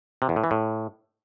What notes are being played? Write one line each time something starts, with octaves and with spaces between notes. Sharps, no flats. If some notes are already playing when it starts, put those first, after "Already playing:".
C3
E2
A2
E3
A2